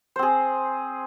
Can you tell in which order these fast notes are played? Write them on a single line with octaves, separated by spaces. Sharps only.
C5 C4 G#4